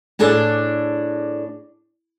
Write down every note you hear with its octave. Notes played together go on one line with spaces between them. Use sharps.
A2 D4 G#4 A4 D5